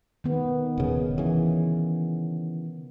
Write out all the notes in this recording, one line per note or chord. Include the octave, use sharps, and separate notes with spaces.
D#3 B3
D#1 C#3
C#3 E3